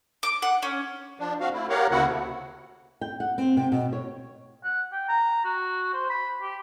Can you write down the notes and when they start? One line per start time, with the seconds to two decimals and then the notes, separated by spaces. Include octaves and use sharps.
0.23 D6
0.42 F#5
0.63 C#4
1.19 F3 D4
1.40 C4 F#4 F5
1.53 A3 E4
1.69 G4 A#4 C#5 F5 F#5
1.91 D2 C#3 A#3 E4 F#4 F#5
2.06 C3 A3
3.01 G5
3.20 F#5
3.38 C4
3.57 C3
3.72 B2
3.93 C#5
4.64 F#5
4.92 G5
5.08 A#5
5.45 F#4
5.93 C5
6.09 B5
6.41 G4